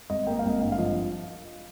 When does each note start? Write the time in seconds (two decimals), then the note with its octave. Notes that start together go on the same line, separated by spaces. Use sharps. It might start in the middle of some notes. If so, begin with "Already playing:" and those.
0.10 G#1 D#5
0.27 A#3 G5
0.39 F5
0.45 G#1 D#5
0.61 G2 F5
0.72 F5
0.78 F3 D#5